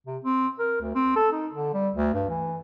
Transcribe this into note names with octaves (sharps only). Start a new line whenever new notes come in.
C3
C4
A#4
D2
C4
A4
D#4
D3
G3
D2
G2
E3